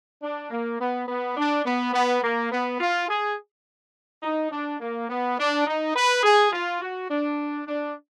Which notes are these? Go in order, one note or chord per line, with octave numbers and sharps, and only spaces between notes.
D4
A#3
B3
B3
D4
B3
B3
A#3
B3
F4
G#4
D#4
D4
A#3
B3
D4
D#4
B4
G#4
F4
F#4
D4
D4